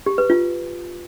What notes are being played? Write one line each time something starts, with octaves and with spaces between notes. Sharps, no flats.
G4
B4
F4